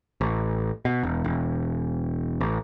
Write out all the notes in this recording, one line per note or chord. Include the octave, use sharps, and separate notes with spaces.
A1
B2
E1
E1
A1